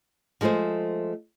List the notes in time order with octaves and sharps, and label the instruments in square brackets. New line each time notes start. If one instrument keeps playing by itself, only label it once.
[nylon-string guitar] F3 G#3 A3 G#4 C5